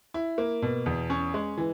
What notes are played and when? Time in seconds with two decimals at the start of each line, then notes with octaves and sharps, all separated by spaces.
0.14 E4
0.38 A#3
0.62 B2
0.86 E2
1.10 C#4
1.34 G#3
1.58 E3